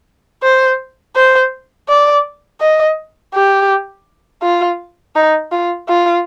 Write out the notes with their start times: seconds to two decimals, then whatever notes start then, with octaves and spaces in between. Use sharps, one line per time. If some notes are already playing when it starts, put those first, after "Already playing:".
0.43 C5
1.16 C5
1.89 D5
2.61 D#5
3.34 G4
4.42 F4
5.15 D#4
5.52 F4
5.89 F4